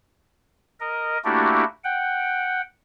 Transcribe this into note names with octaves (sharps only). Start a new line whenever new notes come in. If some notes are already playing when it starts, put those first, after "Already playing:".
A#4 D#5
A3 A#3 D4 E4 F#4 G4
F#5 G5